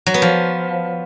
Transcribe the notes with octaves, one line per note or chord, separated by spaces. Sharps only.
F#3
B3
F3